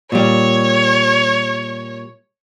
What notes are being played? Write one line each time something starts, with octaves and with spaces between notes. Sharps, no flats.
A#2 G3 C#5